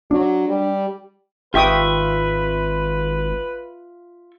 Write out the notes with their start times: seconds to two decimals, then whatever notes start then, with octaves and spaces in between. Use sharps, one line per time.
0.11 F#3 D4
0.48 G3
1.54 G#1 F4 G4 B4 E5 G5 C#6 D#6